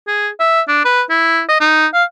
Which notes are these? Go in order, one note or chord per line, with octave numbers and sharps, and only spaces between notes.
G#4
E5
D4
B4
E4
D#5
D#4
F5